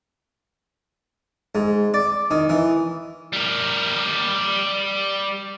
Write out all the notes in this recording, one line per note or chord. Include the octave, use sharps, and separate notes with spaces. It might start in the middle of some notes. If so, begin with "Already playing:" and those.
G#2
D5
D#3
E3
G3 A#4